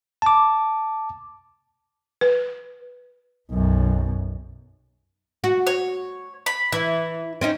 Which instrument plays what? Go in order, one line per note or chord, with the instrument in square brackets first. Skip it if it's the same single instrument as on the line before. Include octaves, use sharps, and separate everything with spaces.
[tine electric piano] A5 D6
[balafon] B4
[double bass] B1 F#2
[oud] F#4
[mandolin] C#5
B5
[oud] E3 [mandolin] E4
[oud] C4 C#4 D#4